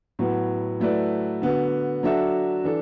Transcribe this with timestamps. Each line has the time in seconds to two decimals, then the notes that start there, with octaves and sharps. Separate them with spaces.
0.19 A2 F#3 B3
0.80 F#3 A3 E4 B4 D5
1.42 D3 B3 F#4
2.03 F#3 D4 F#4 A4 E5
2.64 E3 D4 A4